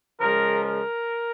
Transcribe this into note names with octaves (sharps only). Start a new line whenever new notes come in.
C#3 F3 G#3 A#4
A#4